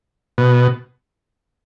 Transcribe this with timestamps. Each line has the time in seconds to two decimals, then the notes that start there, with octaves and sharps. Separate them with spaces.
0.38 B2